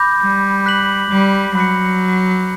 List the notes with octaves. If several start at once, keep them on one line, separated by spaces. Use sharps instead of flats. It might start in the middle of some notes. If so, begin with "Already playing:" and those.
Already playing: B5 D6 G6 A#6
G3
F#6 B6 F#7
G3
F#3 B5 F#6 C#7